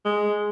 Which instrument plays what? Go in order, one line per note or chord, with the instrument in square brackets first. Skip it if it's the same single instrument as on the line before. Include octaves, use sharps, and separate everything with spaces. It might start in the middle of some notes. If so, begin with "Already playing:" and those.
[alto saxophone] G#3